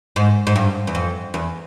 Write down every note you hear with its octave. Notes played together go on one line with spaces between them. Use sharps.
G#2
G#2
G2
E2
F2
E2